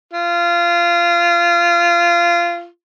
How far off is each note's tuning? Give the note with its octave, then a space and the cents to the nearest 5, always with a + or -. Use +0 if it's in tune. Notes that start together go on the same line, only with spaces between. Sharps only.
F4 -20